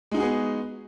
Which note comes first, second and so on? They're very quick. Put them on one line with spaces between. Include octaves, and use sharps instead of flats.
G#3 D#4 F#4 G#4 B3